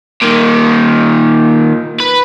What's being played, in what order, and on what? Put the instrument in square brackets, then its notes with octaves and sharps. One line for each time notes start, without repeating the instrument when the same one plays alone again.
[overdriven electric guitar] A#2 D#3
B4